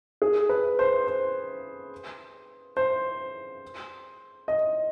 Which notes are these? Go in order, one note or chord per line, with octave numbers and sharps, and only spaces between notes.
G#4
B4
C5
C5
C5
D#5